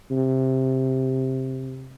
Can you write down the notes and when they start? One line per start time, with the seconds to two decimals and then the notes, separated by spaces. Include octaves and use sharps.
0.11 C3